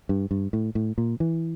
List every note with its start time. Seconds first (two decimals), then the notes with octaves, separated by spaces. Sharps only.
0.09 G2
0.31 G2
0.53 A2
0.75 A2
0.98 A#2
1.20 E3